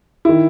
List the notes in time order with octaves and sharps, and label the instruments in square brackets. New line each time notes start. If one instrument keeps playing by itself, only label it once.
[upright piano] D#3 E4